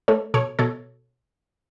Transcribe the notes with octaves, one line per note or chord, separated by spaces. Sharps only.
A3 A4 C#5
B2 A4 C#5
B2 A4 C#5